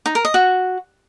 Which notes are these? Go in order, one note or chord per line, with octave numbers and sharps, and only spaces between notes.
D#4
A#4
D#5
F#4